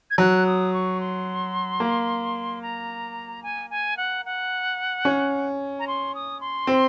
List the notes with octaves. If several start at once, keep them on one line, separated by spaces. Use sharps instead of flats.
G#6
F#3 F#6
D#6
C#6
C6
A#3
A#5
G#5
G#5
F#5
F#5
C#4
A#5
C6
D#6
C6
C4